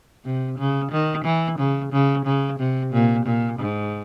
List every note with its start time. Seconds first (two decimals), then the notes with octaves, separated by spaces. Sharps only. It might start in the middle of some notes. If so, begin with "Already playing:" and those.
0.25 C3
0.58 C#3
0.91 D#3
1.25 E3
1.58 C#3
1.92 C#3
2.25 C#3
2.59 C3
2.92 A#2
3.25 A#2
3.59 G#2